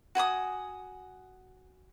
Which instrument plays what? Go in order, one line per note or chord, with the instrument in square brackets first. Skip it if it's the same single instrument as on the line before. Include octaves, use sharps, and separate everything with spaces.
[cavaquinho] F#4 G#5 B5 D#6